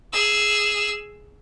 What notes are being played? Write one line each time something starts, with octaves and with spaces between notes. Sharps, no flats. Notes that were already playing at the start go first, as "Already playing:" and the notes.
G#4 E6